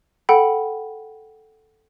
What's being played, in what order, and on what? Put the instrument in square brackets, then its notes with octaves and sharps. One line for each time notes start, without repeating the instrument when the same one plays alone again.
[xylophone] A4 F#5 G5 B5